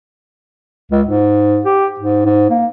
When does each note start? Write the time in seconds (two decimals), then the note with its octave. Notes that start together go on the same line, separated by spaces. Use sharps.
0.91 C#2
1.07 G#2
1.65 G4
1.99 G#2
2.26 G#2
2.50 A#3